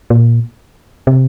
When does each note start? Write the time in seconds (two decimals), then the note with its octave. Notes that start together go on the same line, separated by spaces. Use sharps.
0.10 A#2
1.07 C3